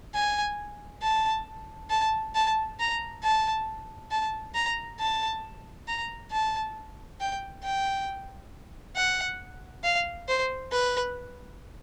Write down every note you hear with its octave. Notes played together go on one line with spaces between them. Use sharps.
G#5
A5
A5
A5
A#5
A5
A5
A#5
A5
A#5
A5
G5
G5
F#5
F5
C5
B4